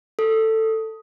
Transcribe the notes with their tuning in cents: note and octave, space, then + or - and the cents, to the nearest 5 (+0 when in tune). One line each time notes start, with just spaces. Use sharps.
A4 +15